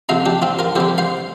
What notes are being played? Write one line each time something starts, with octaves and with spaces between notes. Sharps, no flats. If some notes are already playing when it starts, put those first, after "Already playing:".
F2 C3 F3 F5 A#5
D4 G4
C4 F4
F4 A#4
F2 D3 G3 G4 C5
C5 F5